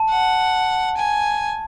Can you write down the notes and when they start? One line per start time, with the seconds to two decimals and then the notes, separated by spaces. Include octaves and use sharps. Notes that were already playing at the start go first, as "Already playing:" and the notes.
Already playing: A5
0.10 F#5
0.97 G#5